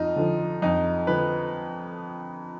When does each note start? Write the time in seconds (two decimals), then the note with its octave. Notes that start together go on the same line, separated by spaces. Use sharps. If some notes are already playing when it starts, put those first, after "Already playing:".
Already playing: F2 D#4 F4
0.16 D3 F3
0.62 F2 D#4
1.07 D3 F3 B4